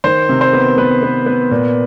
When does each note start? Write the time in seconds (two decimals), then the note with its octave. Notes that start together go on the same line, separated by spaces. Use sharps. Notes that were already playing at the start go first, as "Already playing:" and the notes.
0.04 D#3 C5
0.29 C3
0.41 C5
0.53 B3
0.78 B3 B4
1.03 B3
1.26 B3
1.51 A#2